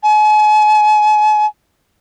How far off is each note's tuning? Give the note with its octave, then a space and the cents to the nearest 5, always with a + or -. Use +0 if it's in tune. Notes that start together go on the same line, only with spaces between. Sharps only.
G#5 +40